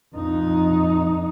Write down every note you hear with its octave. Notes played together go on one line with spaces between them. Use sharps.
F2 D#4